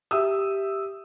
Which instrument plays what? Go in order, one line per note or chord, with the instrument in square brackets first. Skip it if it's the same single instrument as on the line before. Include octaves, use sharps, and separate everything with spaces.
[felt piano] G4 E5 D#6 E6